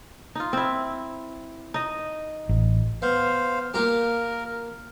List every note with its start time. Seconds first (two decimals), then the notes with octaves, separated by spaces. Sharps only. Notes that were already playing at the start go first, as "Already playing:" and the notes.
0.35 D#4 F4
0.53 C4 E4
1.74 D#4 D#5
2.49 A1
3.02 B3 C5 F5
3.74 A#3 F4 G4 A#4